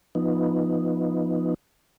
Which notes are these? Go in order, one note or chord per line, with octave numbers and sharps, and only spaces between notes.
F3 B3 D#4